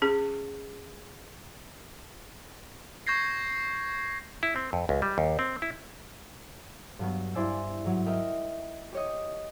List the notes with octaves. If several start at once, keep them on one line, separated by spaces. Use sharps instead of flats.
C#4 G#4
C#6 G6 G#6 A#6 C7
E4
C4
F2
C#2
G3
D#2
C4
E4
G2 F#3 B3
G2 E4 C5 D5 G#5 E6
G#2 F#3
A#4 D#5 E5 G5
G4 C#5 D#5